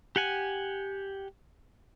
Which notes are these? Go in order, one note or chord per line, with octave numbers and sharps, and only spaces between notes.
G4 F#5 G#5